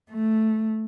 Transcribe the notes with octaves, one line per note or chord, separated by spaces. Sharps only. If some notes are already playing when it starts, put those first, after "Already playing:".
A3